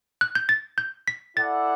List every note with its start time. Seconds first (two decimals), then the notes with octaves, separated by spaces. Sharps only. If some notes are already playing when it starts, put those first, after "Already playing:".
0.21 F#6
0.35 G6
0.49 A6
0.78 G6
1.08 B6
1.37 E4 A4 D5 F#5 A6